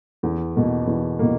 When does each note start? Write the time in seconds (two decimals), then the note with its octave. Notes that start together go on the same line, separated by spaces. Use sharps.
0.23 E2
0.56 B2 A#3
0.87 E2
1.19 B2 A#3